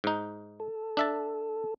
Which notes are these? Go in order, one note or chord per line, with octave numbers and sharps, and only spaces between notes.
G#2 D#4
A4
D4 E5 A5